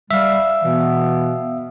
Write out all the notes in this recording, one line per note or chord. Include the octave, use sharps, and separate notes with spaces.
G3 E5 F5
B2 E3 B3